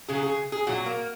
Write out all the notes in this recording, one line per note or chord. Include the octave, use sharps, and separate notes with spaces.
C#3 F#3 G#4
G#4
G#4
A#2 F#3 F#4
A#3